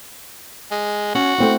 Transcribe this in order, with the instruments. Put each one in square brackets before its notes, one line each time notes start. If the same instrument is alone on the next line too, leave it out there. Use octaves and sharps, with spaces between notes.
[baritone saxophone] G#3
[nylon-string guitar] C#4 [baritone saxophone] F#4
[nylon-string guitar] A3 C4 E4